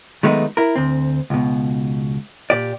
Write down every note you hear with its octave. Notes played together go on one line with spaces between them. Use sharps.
D#3 F#3 G#3 A3 B3 D#4
E4 A#4
D2 C4
C#2 B2
A#2 G4 D5